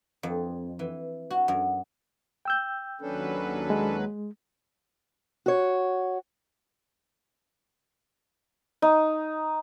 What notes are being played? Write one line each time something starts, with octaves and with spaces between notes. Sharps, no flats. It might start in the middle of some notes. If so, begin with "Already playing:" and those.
F2
E3
F#4
F#2
G5 E6 G6
D#2 F#3 C#4 D4 A4 B4
G#3
F#4 C#5
D#4